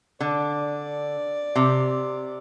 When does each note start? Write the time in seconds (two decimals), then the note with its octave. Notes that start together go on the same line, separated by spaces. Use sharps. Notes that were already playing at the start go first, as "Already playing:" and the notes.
0.20 D3 D5
1.56 C3